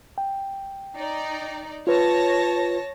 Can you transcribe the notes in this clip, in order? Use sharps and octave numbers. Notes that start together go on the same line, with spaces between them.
G5
D#4 D5
F4 B4 C#5 A5 A#6